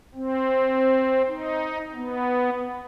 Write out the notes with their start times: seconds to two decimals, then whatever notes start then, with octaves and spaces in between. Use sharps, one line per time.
0.15 C4
1.28 D#4
1.95 B3